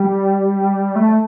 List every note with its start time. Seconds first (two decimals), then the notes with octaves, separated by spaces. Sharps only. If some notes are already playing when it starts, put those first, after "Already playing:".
Already playing: G3
0.96 A3